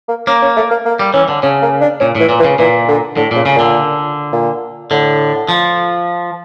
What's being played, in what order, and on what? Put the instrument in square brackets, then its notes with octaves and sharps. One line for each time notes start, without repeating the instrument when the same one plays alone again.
[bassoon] A#3
[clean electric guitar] A#3 [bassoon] C#4
[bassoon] C#4
A3
A#3
A#3
[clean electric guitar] G3
[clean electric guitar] E3 [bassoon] C#4
[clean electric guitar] D3
[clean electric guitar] C#3 [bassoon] C#4
[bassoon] A#3
D4
[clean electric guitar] A#2 [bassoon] C#4
[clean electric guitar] A2 [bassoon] E3
[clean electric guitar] A#2
[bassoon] E3
[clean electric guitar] C#3
[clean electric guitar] A#2 [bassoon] E3
[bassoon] D3
[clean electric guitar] A2 [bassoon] D3
[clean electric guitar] A#2 [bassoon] C#3
[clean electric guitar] C#3
[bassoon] A#2 [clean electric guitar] D3
[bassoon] A#2
[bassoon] A2 [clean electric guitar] D3
[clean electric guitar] F3